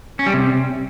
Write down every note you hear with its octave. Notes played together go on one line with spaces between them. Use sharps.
C#4
G3
C3